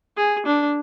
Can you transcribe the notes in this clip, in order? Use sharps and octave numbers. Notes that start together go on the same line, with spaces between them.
G#4
D4